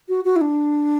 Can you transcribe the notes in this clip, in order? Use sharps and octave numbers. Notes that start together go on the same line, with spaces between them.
F#4
F#4
E4
D4